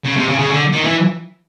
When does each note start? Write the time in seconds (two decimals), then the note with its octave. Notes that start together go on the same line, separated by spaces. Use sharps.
0.06 C#3
0.17 C3
0.28 C#3
0.39 C#3
0.50 D3
0.73 D#3
0.84 E3